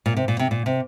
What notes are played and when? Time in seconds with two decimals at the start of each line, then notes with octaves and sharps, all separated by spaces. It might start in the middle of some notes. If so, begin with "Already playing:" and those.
0.06 A#2
0.16 C3
0.28 A#2
0.39 C3
0.51 A#2
0.66 C3